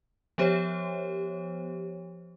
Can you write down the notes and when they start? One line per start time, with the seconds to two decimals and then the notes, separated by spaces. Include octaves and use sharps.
0.38 F3 B3 G4 C5 C#5